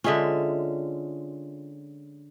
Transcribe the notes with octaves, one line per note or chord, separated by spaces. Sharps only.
D3 G#3 C#4 F4 E5